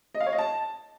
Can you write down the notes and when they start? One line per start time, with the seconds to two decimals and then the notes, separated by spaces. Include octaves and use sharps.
0.14 D#5
0.20 F5
0.26 C#5
0.32 D#5
0.38 A5